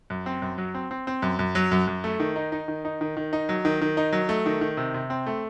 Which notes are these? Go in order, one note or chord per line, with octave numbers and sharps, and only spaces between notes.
F#2
C4
F#2
F#3
C4
C4
C4
F#2
F#2
F#3
F#2
F#2
A3
D#3
D#4
D#4
D#3
D#4
D#3
D#3
D#4
F#3
D#3
D#3
D#4
F#3
A3
D#3
D#3
C3
C3
C4
A3